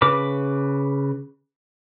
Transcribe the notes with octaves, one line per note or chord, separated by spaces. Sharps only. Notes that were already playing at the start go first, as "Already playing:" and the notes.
C#3 B4 D6